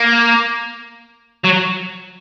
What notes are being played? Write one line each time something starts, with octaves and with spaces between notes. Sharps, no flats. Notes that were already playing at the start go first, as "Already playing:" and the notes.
Already playing: A#3
F#3